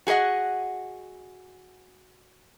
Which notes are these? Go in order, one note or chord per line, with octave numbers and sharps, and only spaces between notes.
F#4 G#4 A#4 D#5 F#5